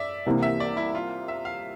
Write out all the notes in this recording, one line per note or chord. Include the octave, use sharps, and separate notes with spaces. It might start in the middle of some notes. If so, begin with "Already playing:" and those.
Already playing: D5 E5
C2 C3 E3 A#3
E5
D5
E4
F4
E5
F5